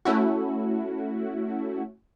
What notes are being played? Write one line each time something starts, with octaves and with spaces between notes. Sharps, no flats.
A3 C#4 E4 F#4